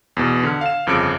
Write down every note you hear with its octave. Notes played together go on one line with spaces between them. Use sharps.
E2 B2
D3 F6
F5 E7
G1 F2 C#3 D6 C#7 D7